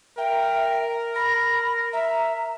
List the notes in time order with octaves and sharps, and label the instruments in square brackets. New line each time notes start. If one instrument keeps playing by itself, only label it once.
[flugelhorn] A#4 [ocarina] E5 [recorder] G5
[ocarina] B5 [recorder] A#6
[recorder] E5 [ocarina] A#5